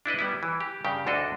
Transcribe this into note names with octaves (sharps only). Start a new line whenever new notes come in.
D4 E4 B4 D#5
G3 B3 E4
E3
G4
G2 C#3 G4 G5
D2 D3 D4 F#4 A4 D#5